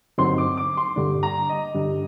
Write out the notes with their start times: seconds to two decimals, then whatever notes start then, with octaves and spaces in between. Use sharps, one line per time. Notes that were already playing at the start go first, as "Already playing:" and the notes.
0.18 G2 D3 F#3 C4 D#4 C6
0.38 D6
0.57 D6
0.77 C6
0.96 G2 D3 G3 D4
1.23 A#5
1.49 D#5
1.75 G2 D3 G3 D4